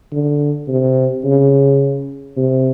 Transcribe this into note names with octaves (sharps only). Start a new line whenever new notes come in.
D3
C3
C#3
C3